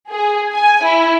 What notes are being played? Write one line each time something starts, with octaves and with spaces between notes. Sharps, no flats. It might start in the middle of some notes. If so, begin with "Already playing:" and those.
G#4
G#5
E4